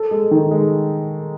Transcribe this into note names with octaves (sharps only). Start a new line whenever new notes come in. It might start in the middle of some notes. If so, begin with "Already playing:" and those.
Already playing: A4
G#3
D#3
G#3